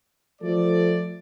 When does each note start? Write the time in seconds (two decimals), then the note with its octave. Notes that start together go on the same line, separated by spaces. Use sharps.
0.42 F3 A3 A4 D5